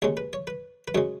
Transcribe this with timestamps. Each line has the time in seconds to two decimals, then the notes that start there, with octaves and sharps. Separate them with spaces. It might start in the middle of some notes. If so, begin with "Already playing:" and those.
0.02 D#2 C#3 G#3 C#5
0.17 B4
0.33 C#5
0.47 B4
0.88 B4
0.95 F#2 C#3 G#3 C#5